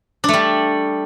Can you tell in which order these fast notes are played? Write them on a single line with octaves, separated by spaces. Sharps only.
D4 A3 G3